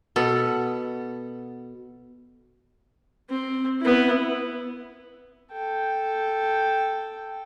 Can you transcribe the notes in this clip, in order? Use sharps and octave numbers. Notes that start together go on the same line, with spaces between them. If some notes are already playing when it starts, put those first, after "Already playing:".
B2 B3 A4
C4
B3 E4
A4 G5